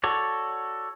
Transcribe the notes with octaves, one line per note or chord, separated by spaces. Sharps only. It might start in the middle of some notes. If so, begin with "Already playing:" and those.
F#4 A4 C#5 D5